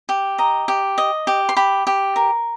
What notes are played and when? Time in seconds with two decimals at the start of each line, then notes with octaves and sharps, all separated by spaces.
0.09 G4
0.38 D#5 A#5
0.68 G4
0.98 D#5
1.27 G4
1.49 C6
1.56 G4 B5
1.87 G4
2.16 A#4